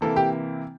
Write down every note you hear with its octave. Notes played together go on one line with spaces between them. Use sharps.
C3 E3 A#3 E4 A4
G4